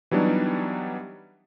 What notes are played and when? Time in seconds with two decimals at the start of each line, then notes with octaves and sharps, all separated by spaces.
0.11 E3 F#3 G3 B3 D4 D#4